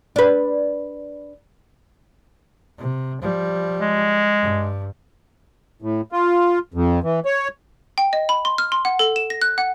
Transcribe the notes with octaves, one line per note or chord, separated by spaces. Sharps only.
D4 B4
C3
F3 G3
G#3
G2
A2
F4
F2
E3
C#5
G5
D#5
B5
C6
F6
C6
F#5
A4
E7
A#6
F#6
F#5